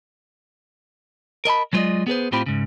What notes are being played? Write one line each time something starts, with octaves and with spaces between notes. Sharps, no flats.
A#4 D#5 A5 B5
F#3 G#3 F4 C5 D5 D#5
B3 G#4 B4 C5
A2 C4 F4 G4 C5 B5
G#2 C#3